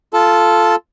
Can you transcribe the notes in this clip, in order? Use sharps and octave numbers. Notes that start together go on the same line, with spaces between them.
F4 A4 A5